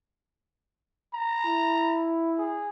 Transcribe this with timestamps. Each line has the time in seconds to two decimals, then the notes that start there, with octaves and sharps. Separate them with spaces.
1.14 A#5
1.46 E4
2.38 G#4